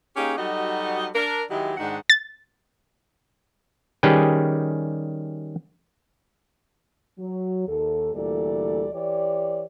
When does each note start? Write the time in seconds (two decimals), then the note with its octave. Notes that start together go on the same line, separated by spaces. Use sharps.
0.17 A#3 C#4 D#4 G4 G#4
0.37 F#3 G3 D#4 F#4 A4 D#5
1.15 D4 A#4
1.50 D#3 F#3 G#3 E4 G4
1.77 G#2 D#3 D4 D#4 F#5
2.10 A6
4.03 D#3 G3 C#4 G4 G#4 B4
7.18 F#3
7.67 D#2 A4
8.14 D2 A#2 E3 G3 A4 D5
8.93 E3 G4 C#5 D5